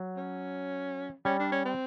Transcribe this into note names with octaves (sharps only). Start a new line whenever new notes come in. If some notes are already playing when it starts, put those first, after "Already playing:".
Already playing: F#3
C#4
G3 C#4
D4
C#4
C4